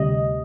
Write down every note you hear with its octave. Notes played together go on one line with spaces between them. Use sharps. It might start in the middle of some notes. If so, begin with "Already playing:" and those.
Already playing: D2 C3 G3 D#5